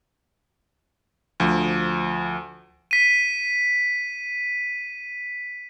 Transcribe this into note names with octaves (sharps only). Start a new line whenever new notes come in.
D2 F3
B6 D#7